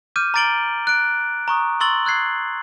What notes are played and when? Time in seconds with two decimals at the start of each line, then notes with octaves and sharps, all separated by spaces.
0.16 D6 F6 G6 D#7
0.34 A#5 D6 A6 D7 F#7 G7
0.87 F#6 D7
1.48 A#5 C#6 D#6
1.80 C6 C#6 E6 A6 F#7 G7
2.05 E6 F#6 G#6 C7